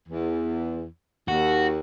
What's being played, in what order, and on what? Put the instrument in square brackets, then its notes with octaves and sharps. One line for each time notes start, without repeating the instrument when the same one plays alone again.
[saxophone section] E2
[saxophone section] D#2 [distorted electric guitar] F#4